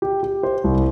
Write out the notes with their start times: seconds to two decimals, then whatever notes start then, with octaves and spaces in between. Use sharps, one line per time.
0.02 G4
0.23 G4
0.43 C5
0.64 C2